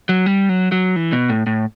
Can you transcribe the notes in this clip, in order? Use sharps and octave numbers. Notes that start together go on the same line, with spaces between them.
F#3
G3
F#3
F#3
E3
B2
A2
A2